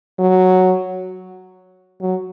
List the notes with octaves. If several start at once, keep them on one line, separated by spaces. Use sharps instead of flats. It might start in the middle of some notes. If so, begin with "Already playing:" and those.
F#3
F#3